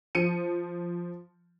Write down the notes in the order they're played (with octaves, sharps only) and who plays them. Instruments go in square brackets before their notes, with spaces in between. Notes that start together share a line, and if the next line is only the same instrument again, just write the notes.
[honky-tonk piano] F3 C#7 D#7